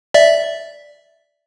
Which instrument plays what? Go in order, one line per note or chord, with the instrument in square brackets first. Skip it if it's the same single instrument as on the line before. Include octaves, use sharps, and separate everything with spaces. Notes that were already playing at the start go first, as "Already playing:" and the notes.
[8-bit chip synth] D5 E5